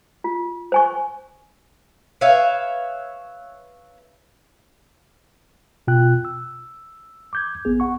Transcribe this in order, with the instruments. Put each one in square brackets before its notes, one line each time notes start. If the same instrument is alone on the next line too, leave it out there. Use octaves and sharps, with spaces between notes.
[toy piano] F4
C5 G#5 C#6
[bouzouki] B4 C#5 E5 F5
[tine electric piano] B2 F4 G5 F#6
E6
D6 G6 G#6
A1 B3 G#4
F#5 C#6